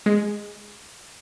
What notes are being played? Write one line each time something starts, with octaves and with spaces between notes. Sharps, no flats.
G#3